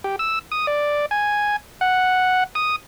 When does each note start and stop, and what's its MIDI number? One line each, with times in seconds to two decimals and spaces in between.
0.04 0.16 67
0.19 0.39 88
0.52 0.66 87
0.67 1.06 74
1.11 1.56 80
1.81 2.44 78
2.55 2.76 87